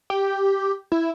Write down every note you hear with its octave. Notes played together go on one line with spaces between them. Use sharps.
G4
E4